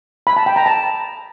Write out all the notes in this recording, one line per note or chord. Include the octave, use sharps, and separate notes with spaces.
B5
A5
G5
A#5
A5